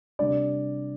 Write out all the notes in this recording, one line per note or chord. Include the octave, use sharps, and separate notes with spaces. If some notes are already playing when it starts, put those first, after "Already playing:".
C3 G3 D4 D5